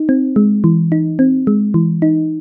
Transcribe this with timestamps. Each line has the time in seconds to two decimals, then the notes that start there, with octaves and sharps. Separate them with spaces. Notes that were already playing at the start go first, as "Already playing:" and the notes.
Already playing: D#4
0.09 C4
0.36 G#3
0.64 E3
0.92 D#4
1.19 C4
1.47 G#3
1.74 E3
2.02 D#4